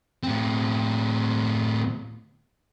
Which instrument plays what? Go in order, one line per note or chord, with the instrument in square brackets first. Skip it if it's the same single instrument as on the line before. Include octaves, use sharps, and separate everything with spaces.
[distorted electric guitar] A2 C4